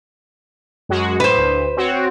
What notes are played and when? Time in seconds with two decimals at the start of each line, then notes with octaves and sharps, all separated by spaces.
0.89 F#2 G#3 F#4
1.20 A2 B4 C5
1.38 D2
1.77 C4 F#4 C#5